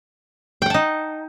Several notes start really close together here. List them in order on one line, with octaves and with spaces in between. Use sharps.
G5 F#5 A5 D#4